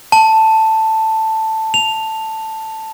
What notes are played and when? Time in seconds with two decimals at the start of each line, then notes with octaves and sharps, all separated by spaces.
0.12 A5
1.74 F7